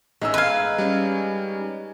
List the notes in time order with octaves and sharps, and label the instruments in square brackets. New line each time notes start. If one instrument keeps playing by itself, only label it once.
[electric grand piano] A1 E6 [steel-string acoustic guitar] G#3 D#4
[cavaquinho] B4 F5 [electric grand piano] E6 G#6
[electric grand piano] G3 C#4